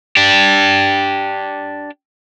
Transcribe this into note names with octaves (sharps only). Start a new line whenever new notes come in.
D4 G4